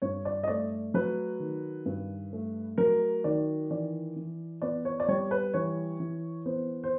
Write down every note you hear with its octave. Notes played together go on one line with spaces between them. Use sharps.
G2 C#5
D5
D#5
A3 D5
F#3 B4
D#3
G2
A3
F#3 A#4
D#3 D5
E3 D5
E3
B3 D5
C#5
D5
G3 C#5
B4
E3 C#5
E3
B3 C5
C5